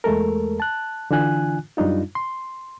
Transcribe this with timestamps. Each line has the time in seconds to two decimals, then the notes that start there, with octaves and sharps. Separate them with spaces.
0.04 E2 G#3 A3 A4 A#4
0.60 A5 F#6
1.11 D3 E3 D4 F4 G#5 F#6
1.77 F#2 G3 D4 D#4 F4
2.15 C6